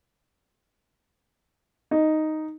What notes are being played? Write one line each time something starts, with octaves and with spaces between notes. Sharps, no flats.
D#4